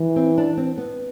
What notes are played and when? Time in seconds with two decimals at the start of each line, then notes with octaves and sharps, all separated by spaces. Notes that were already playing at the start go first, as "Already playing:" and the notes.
Already playing: E3
0.16 C4
0.38 D4
0.57 C4
0.78 B3